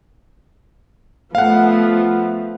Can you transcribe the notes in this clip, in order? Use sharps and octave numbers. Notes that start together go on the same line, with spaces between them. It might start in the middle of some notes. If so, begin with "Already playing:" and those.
F3 A3 B3 F5 F#5